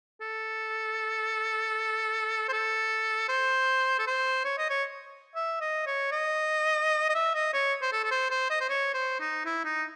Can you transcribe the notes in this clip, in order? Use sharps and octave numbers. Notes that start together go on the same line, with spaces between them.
A4
C5
A4
C5
A4
C5
C#5
D#5
C#5
E5
D#5
C#5
D#5
D#5
E5
D#5
C#5
C5
A4
A4
C5
C5
D#5
C5
C#5
C5
D#4
E4
D#4